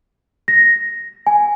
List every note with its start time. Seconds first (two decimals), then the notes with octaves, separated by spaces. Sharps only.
0.48 A#6
1.27 G#5